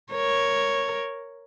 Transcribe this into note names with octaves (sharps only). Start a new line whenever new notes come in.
A#4 C#5